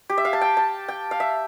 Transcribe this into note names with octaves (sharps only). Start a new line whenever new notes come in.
G4
E5
F5
A5
G5
A5
G5
F5
E5